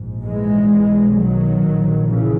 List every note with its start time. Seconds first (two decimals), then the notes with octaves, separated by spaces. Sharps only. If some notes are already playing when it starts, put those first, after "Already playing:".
Already playing: A#1 G#2
0.23 E3 G#3
0.69 B1 B2
1.15 D#3 F#3
1.62 A#1 A#2
2.08 C#3 E3